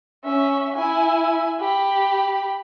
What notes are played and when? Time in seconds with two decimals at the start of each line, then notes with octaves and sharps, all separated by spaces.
0.25 C#4 E5
0.75 E4 G#5
1.61 G4 B5